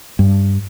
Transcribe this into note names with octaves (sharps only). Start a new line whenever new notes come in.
G2